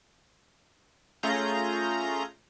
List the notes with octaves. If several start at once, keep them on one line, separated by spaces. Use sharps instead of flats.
A3 C#4 F4 G#4 A#5 G6